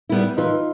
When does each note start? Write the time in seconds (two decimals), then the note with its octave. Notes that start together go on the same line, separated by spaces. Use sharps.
0.09 G3 B3 E4
0.37 E3 D#4 F4